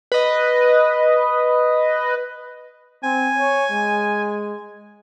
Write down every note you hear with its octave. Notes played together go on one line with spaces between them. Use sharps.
B4 D#5
C4 G#5
C#5
G#3